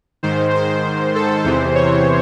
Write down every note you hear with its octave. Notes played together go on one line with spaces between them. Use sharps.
G#2 D#3 C5
C5
A4
E2 C3 E3 C5
C#5